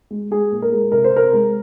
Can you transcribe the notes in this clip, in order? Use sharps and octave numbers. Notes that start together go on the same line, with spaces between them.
G#3
G#3 G#4
A#2
A#4
G#3
C3 A#4
C5
C3 A#4
G#3